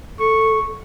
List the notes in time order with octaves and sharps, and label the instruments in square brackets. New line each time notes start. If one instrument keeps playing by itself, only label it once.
[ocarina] A4 [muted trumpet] C#6